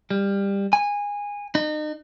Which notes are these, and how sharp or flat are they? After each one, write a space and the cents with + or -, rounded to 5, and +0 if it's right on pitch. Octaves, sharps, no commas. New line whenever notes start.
G3 +20
G#5 -20
D#4 -35